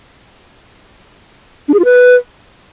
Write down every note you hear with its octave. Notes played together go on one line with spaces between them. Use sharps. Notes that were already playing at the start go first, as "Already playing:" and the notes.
D4
G#4
F4
B4